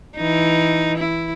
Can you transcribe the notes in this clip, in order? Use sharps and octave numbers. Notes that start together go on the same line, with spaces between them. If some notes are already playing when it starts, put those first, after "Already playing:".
E3 D#4
E4